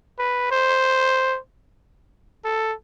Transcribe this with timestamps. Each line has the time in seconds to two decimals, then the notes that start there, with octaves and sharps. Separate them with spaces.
0.19 B4
0.52 C5
2.45 A4